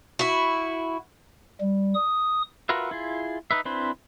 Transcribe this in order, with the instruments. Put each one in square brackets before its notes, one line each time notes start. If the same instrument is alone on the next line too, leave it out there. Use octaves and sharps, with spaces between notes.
[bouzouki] E4 F#4
[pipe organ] G3
D#6
[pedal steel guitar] F4 F#4 A#4 B4 E5
E4 F4 G#4
D#4 B4 E5
C4 D4 E4 B4 C5